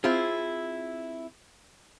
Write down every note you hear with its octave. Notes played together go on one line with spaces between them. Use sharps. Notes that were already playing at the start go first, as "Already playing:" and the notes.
C4 E4 F4 G#4